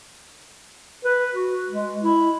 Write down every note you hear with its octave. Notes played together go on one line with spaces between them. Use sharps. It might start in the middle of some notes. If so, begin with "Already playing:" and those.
B4
F#4
G#3
E4